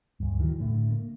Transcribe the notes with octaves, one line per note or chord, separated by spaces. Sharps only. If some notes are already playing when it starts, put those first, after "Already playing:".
D2 G2
D#3 E3 F#3
A2 D3 A3
A#3